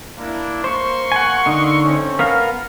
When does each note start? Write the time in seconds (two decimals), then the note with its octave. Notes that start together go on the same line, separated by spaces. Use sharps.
0.17 A#3 D4 E4
0.64 A#3 C5 C6 C#6
1.12 F#5 G#5
1.46 D3 D#4
1.82 A3 C4 C#4
2.19 B3 A#4 F5